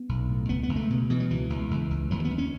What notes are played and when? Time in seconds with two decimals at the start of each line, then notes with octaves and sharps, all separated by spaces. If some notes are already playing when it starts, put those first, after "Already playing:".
Already playing: B3
0.09 B1
0.29 A2
0.49 C#2 B3
0.63 B3
0.69 C#2
0.76 A3
0.90 B2
1.10 B2 E3
1.20 F#3
1.30 C#2 E3
1.50 C#2
1.71 C#2
1.91 C#2
2.11 D#2 F#3
2.25 B3
2.31 D#2
2.38 C#4